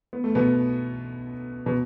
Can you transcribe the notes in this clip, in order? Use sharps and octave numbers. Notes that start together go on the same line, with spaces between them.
B3
A3
B2 B3
B2